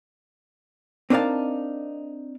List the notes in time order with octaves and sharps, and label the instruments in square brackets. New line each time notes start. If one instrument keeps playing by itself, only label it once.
[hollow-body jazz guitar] C4 D4 D#4 A#4 F5 A5